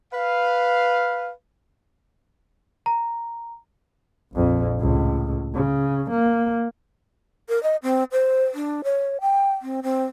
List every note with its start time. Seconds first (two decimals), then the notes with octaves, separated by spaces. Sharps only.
0.13 B4 F5
2.86 A#5
4.32 A#1 F2
4.80 C#2 A2
5.54 C#3
6.11 A#3
7.49 A#4
7.63 D#5
7.83 C4
8.12 C5
8.55 D4
8.84 C#5
9.21 G5
9.62 C4
9.83 C4